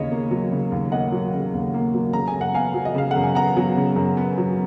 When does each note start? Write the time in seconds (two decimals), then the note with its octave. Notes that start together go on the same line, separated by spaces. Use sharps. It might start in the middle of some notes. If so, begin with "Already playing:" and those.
Already playing: D#2 C#3 C#5 D#5
0.12 A#3
0.31 F#3
0.52 C#3
0.72 D#2
0.92 A#3 D#5 F#5
1.12 F#3
1.33 C#3
1.54 D#2
1.74 A#3
1.94 F#3
2.13 C#3 A#5
2.28 G#5
2.34 F#2
2.41 F#5
2.54 B3 F5 G#5
2.74 F#3
2.85 D#5
2.95 C#3 F5
3.11 F#5
3.16 F#2
3.24 G#5
3.35 B3 F#5 A#5
3.57 F#3
3.76 C#3
3.96 F#2
4.17 B3
4.38 F#3